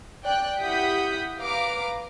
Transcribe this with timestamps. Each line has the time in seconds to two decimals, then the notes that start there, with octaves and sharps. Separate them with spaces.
0.25 D5 G5 F#6
0.61 E4 G4 F#5 D#6 G6 B6
1.39 B4 F5 A#5 D6